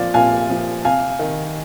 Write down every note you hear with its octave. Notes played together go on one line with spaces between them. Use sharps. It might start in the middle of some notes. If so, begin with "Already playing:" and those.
Already playing: A#2 F3 D5 F5
A#2 F5 G#5
F3
C3 F5 G#5
D#3